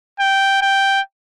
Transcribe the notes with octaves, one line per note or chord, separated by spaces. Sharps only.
G5
G5